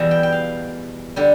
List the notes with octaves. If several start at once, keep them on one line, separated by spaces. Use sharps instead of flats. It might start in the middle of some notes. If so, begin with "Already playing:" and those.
Already playing: E2 B2 G3 E5
G5
G5
F5
D3 G3